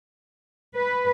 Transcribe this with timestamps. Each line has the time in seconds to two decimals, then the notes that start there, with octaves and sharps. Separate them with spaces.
0.78 B4